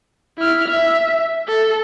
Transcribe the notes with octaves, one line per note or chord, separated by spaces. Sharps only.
E4 F6
E5
A4